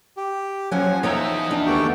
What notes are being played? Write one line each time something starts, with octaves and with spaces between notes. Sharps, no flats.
G4
F3 F#3 C#4 F#5 G#5
E2 D#4 C#5 D#5 E5 G5 A#5
D4
D#2 A3 B3 F#4 G4 G5